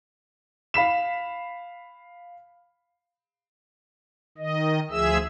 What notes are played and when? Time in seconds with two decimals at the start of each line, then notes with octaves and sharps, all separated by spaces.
0.74 F5 B5 B6 E7
4.38 D#3 D#5
4.91 D2 F3 G#4 E5 E6